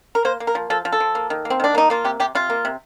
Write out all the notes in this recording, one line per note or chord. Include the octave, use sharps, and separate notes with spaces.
A#4
A#3 C5
A#3
A#4
F3
F3 A4
F3
A4
F3
A#3
D#3
A#3
C4
D#3 D4
A#3 D#4
A#3 F4
C3 G4
C3 G4
C3 F4
A#3
C3